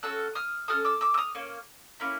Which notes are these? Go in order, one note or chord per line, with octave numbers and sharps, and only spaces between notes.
C#4 F#4 A4 E6 F#6
D#6 F6
C#4 F#4 A4 D#6 F6
D6 E6
D6 E6
E6
D#6 F6
A#3 C#4
A#3 C#4 E4